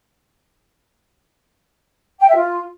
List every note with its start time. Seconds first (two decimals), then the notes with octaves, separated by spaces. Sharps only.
2.20 G5
2.28 E5
2.35 F4